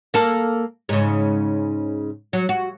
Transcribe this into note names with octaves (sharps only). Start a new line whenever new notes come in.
A#3 A4
G#2 C#3
F#3
F#4